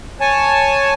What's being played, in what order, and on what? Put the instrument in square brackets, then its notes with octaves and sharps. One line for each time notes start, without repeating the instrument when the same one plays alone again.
[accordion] C#5 G#5 A5